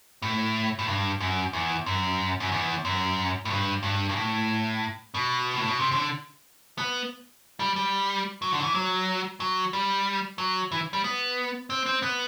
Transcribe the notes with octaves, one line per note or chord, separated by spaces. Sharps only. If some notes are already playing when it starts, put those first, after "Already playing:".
A2
A2
G2
F#2
E2
F#2
F#2
E2
F#2
A2
G2
G2
G2
A2
B2
A2
B2
C3
C3
D3
B3
G3
G3
F#3
D3
F#3
E3
F#3
F#3
G3
F#3
E3
G3
B3
C4
C4
B3